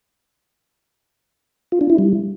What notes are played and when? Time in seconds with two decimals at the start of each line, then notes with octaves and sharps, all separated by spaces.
1.72 F4
1.81 D4
1.90 E4
1.99 G3